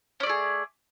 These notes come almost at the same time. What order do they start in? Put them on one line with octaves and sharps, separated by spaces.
C#4 D5 A3 G#4